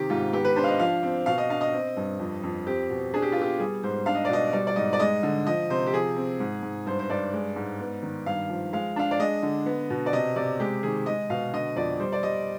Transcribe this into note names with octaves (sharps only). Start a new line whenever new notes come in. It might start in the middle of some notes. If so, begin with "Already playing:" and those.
Already playing: C3 D#3 G4
G#2 F4
B3 G4
B4
D4 C5
F5
D#5
F3 F5
C4
B2 F5
D#5
D4 F5
D#5
C4
G2
F2
F2
C4 G4
B2
D4 G#4
G4
B3 F4
G4
G3 G#4
G#2 C5
D4 F5
D#5
D5
B2 D#5
G3 D5
D5
G#2 D#5
D5
G#3 D#5
D3
F3 D#5
C3 C5
G4
F3 G#4
C4
G#2
G#2
G2 C5
C5
G2 D5
G#3
G#2
B3
D#3
G2 F5
F3
G#3 F5
D4 F5
D5
G#3 D#5
D3
B3
B2
D5
C3 D#5
C3 D5
G#3 G4
D#3 G#4
G#3 D#5
B2 F5
D3 D#5
F2 D5
G3 C5
D5
G3 D#5